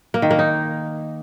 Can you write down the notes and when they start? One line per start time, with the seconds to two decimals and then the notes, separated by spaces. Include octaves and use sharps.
0.14 A#3
0.22 D#3
0.31 A#3
0.39 D#4